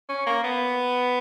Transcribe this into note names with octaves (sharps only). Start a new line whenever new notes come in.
C#4
A#3
B3